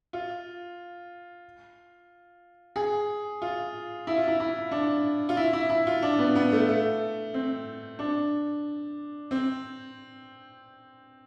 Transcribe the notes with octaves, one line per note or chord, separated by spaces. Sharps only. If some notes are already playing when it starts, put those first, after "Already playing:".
F4
G#4
F4
E4
F4
E4
E4
D4
F4
E4
E4
E4
F4
D4
B3
B3
A3
A3
C4
D4
C4